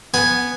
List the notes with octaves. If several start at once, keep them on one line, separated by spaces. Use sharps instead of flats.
B3 G#5